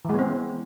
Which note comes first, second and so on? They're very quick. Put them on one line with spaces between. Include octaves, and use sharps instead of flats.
E3 G#3 B3 C4